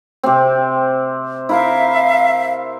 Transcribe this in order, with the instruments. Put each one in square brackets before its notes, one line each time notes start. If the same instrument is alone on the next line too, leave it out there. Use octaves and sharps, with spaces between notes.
[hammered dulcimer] C3 C4
[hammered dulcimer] E4 A#4 [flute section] E5 F5